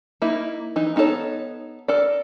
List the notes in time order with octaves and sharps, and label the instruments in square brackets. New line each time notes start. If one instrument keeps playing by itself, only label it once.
[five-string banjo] A#3 D#4 E4
E3 D#4
B3 D#4 F4 A4 C#5
A4 A#4 D5